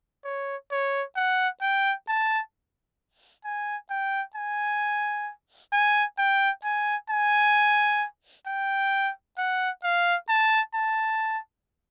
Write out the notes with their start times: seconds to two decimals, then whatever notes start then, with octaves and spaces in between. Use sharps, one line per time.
0.24 C#5
0.71 C#5
1.16 F#5
1.61 G5
2.08 A5
3.45 G#5
3.90 G5
4.35 G#5
5.73 G#5
6.18 G5
6.64 G#5
7.09 G#5
8.47 G5
9.38 F#5
9.83 F5
10.29 A5
10.74 A5